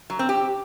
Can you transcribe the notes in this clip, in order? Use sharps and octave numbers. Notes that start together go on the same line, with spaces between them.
F#3
C4
G4